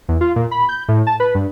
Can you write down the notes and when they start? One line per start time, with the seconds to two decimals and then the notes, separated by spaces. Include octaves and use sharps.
0.08 E2
0.21 F4
0.36 A#2
0.51 B5
0.69 G6
0.88 A2
1.07 A5
1.20 B4
1.35 G2